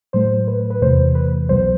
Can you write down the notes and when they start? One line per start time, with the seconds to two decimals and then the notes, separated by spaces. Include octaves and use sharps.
0.13 A2 F#3 A3 C5
0.48 B4
0.70 B4
0.81 E2 C3 E3 A3 C5
1.15 B4
1.49 C2 B2 F#3 C5